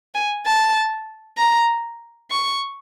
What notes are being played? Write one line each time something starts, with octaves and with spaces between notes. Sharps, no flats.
G#5
A5
A#5
C#6